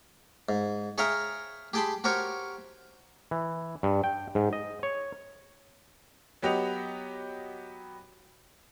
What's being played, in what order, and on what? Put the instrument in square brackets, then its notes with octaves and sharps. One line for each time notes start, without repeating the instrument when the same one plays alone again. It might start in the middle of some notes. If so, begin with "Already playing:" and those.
[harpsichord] G#2
G#4 C#5 E5 F5 G5 A#5
G4 G#4 G5 A5 B5 C6
F#4 G4 A#4 C5 C#5
[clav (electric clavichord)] E3
G2
G5
G#2
D#5
C#5
[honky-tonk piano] F#3 B3 G4 D#5 F#5 F7